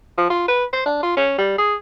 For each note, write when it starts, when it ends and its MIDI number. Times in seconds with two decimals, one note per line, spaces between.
0.18 0.26 53
0.30 0.43 65
0.48 0.65 71
0.73 0.85 72
0.86 0.98 62
1.03 1.15 65
1.17 1.36 61
1.38 1.58 55
1.58 1.75 68